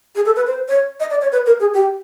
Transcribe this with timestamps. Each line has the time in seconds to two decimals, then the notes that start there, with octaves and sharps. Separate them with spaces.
0.15 G#4
0.25 A4
0.36 B4
0.47 C5
0.68 C#5
1.00 D#5
1.10 D5
1.21 C#5
1.32 B4
1.46 A#4
1.60 G#4
1.74 G4